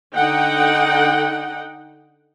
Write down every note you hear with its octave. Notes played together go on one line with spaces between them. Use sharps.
D3 D#4 F#5 G5